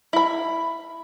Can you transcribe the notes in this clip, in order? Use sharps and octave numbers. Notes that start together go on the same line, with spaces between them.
E4 B5